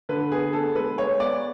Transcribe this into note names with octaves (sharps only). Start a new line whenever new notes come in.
D3 B4
B3 G#4
B3 A4
G#3 B4
G#3 C#5
B3 D5